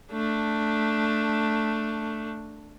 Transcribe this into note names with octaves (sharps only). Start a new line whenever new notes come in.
A3 D4